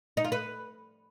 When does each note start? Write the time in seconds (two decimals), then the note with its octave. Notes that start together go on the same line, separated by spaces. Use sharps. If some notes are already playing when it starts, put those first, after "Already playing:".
0.17 D#4
0.25 F4
0.32 B4